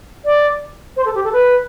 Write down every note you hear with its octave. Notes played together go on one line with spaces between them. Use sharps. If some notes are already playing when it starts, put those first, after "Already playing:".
D5
C5
A4
G4
A4
B4